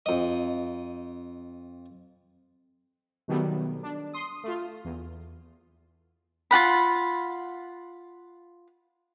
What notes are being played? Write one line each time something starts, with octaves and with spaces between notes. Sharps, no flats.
F2 D#5
B2 D#3 F#3 G3 A3 B3
D4
C6 D#6
A3 F4
E2
F4 F#4 F#5 B5